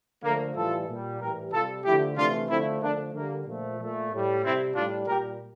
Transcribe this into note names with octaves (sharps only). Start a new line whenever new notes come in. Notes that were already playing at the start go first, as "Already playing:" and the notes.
D3 F3 A3 A#3
A2 E3 G3 F4 A4
A#2 G3
A2 E3 G3 G4 A#4
C3 G3 F4 A4
D3 F3 A3 E4 G4
C3 E3 A3 D4 F4
D3 F3 A3 C4 E4
D3 F3 A3 A#3 D4
D3 G3 A#3
A#2 F3 A3
A#2 A3
A2 G3
C3 G3 C4 E4
A2 G3 D4 F4
A#2 G3 G4 A#4